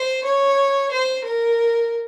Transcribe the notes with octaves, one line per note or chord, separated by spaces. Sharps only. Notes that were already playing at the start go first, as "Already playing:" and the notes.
Already playing: C5
C#5
C5
A#4